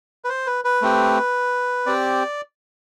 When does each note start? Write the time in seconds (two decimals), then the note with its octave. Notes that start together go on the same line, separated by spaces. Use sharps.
0.24 B4
0.29 C5
0.47 B4
0.65 B4
0.82 A3 C4 G4
1.86 C4 G4 D5